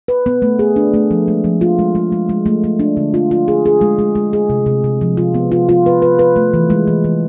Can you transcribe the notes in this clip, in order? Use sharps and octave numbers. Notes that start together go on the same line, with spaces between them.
B4
B3
A3
G#4
D4
A3
F3
G#3
F3
F4
G#3
G#3
G#3
G#3
A3
A3
D4
D3
F4
F4
G#4
G#4
G#3
G#3
G#3
G#4
C3
C3
C3
F3
F4
B3
F4
F4
B4
B4
B4
A3
E3
G#3
E3
E3